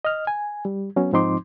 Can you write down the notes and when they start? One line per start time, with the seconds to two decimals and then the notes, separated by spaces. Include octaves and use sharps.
0.05 D#5 F6
0.27 G#5
0.65 G3
0.96 F#3 B3 C#4
1.12 G#2 F3 C4 D#4 C6 D6